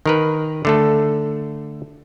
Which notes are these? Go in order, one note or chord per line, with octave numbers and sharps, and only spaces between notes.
D#3 A#4 B4
D3 A3 A4